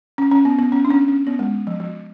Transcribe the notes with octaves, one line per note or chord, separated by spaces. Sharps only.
C#4
C#4
B3
B3
C#4
D4
C#4
C#4
B3
G#3
F3
F3